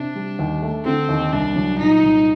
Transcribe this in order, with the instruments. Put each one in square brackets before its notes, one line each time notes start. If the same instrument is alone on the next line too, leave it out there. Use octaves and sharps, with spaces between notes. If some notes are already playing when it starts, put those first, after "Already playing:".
Already playing: [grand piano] C3 [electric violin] D4
[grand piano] G3
D#2
A3
[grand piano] D3 [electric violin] C4
[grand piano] D#2
[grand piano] C2 [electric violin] D4
[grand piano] F#3
[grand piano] A#2 [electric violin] D#4
[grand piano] C2